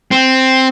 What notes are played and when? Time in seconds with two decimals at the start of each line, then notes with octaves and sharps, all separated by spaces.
0.11 C4